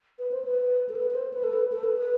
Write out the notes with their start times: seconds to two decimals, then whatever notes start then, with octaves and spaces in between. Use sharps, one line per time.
0.19 B4
0.31 C5
0.45 B4
0.89 A4
0.96 B4
1.10 B4
1.15 C5
1.33 B4
1.44 A4
1.53 B4
1.72 A4
1.84 B4
1.98 B4